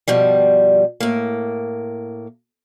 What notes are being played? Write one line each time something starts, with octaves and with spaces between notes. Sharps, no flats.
G2 B2 F3 G3
A2 A#3